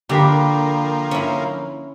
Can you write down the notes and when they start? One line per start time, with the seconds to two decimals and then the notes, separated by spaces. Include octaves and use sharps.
0.09 D3 F3 A#3 G4 A#4 B5
1.11 C#4 E4